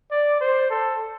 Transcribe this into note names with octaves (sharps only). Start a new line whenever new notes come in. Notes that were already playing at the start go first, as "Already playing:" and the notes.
D5
C5
A4